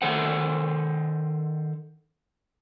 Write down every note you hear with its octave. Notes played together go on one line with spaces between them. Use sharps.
D#3 A4 C5 F#5